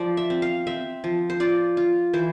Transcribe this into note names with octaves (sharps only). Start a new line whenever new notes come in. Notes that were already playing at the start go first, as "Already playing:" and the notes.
Already playing: F3 D5
E5
C4
F5
C4 E5
F3
C5
F4 D5
F4
E3 C5